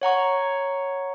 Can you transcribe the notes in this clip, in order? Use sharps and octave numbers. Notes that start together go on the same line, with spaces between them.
C#5 F#5 A#5 C#6